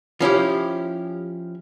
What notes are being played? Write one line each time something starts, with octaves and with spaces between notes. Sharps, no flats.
F3 C#4 E4 G4